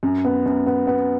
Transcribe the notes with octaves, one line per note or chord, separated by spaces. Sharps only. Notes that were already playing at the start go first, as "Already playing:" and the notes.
F#2
B3
F#2
B3
B3